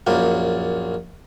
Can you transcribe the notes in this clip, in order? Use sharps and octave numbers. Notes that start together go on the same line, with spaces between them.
A#1 F#2 A#3